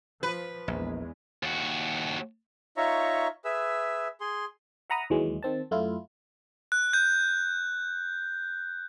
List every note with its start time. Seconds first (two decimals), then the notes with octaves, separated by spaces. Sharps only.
0.23 F3 B4
0.68 A#1 E2 G#3
1.43 D#2 F#4
2.77 D#4 F4 C#5 E5 A#5 C#6
3.45 G#4 B4 E5 E6
4.21 G#4 C6
4.90 E5 F#5 A#5 B5 D#6
5.10 D#2 E3 F#3 G#3
5.43 D#3 C4 A5
5.71 F#2 A3 E4 F4
6.72 F#6
6.93 G6